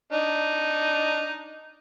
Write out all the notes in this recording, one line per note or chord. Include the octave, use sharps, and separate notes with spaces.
D4 D#4